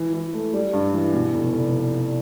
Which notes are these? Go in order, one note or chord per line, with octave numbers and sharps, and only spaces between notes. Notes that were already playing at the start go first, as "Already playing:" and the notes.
Already playing: E3
E3
A3
G3
G2
E3
B2
F1
F1